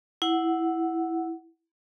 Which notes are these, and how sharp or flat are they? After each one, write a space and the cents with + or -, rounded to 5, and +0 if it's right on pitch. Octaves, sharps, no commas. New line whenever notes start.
E4 +0 F#5 +0